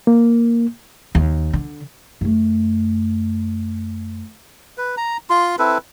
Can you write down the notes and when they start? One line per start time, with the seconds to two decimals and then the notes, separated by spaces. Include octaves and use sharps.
0.07 A#3
1.15 D#2
1.53 D3
2.21 F#2 A3
4.78 B4
4.97 A#5
5.30 F4 C6
5.59 C4 E4 A4 B4